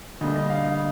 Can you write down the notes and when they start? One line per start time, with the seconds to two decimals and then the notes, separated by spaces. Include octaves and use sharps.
0.21 D2 D3 G3 A#3 D#5
0.36 D#5
0.50 F5
0.64 D#5